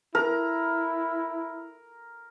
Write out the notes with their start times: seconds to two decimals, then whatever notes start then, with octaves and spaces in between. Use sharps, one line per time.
0.15 E4 A#4